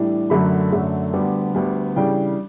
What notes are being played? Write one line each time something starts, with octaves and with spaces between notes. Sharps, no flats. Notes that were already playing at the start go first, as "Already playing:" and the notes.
Already playing: A2 E3 G3 D4
F#2 D3 F#3 A3 B5
F#2 D3 F#3 A3
D2 D3 G3 B3
D2 D3 G3 B3
C#3 E3 G3 D4 G5